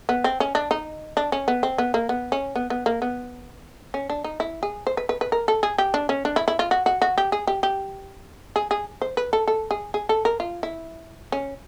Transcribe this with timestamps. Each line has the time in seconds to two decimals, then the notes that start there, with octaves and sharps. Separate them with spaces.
0.09 B3
0.24 C4
0.40 C#4
0.55 D4
0.71 D#4
1.17 D4
1.32 C#4
1.48 B3
1.63 C4
1.78 B3
1.94 A#3
2.09 B3
2.32 C#4
2.56 B3
2.70 B3
2.86 A#3
3.02 B3
3.94 C#4
4.10 D4
4.24 D#4
4.40 E4
4.63 G#4
4.87 C5
4.97 B4
5.09 B4
5.21 B4
5.32 A#4
5.48 A4
5.63 G#4
5.78 G4
5.94 D4
6.09 C#4
6.25 D4
6.36 E4
6.48 E4
6.59 F4
6.71 F#4
6.86 F#4
7.02 F#4
7.18 G4
7.32 G#4
7.47 G4
7.63 G4
8.56 G#4
8.71 G#4
9.02 C5
9.17 B4
9.33 A4
9.48 A4
9.71 G#4
9.94 G#4
10.09 A4
10.25 A#4
10.40 F4
10.63 E4
11.32 C#4